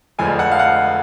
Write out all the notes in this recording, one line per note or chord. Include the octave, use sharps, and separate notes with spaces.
F1 F2 D3 F3 G#3 G#5
F#5
F5
F#5